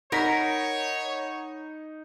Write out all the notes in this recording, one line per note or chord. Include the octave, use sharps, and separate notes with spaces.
D#4 A#4 C#5 F#5 A#5 B5 A#6 B6